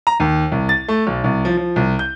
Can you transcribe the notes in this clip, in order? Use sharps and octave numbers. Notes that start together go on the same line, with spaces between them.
A#5
D#2
C2
A6
A3
B1
C2
F3
F3
C2
G6